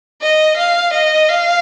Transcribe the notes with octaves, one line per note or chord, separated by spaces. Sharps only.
D#5
F5
D#5
F5